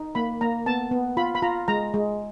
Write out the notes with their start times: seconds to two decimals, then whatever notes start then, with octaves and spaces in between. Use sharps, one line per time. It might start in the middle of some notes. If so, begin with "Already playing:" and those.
Already playing: D#4
0.15 A#3 B5
0.41 A#3 A#5
0.66 B3 A5
0.91 B3
1.17 F4 B5
1.35 B5
1.42 F4 A#5
1.68 G#3 A#5
1.94 G#3